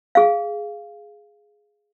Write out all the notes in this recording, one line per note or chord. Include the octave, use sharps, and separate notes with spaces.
G#4 F5